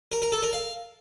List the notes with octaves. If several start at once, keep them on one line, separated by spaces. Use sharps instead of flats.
A#4
A#4
A4
A#4
F5